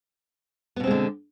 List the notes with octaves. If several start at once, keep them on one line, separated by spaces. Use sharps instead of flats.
B2 D3 G#3 B3 C4